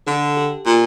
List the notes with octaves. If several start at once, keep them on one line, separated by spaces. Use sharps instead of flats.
D3 A4
G4
A#2 F4